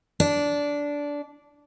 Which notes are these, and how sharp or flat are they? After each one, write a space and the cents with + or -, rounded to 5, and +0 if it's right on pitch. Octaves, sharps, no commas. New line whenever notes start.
D4 -15